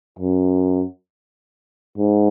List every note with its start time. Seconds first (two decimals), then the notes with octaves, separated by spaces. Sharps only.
0.19 F#2
1.98 G#2